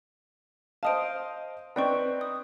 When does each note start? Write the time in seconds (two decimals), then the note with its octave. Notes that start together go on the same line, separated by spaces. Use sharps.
0.83 C5 D#5 F5 A5 D#6 D7
1.76 C4 D#4 B4 D5 G5 C#6
2.21 D#6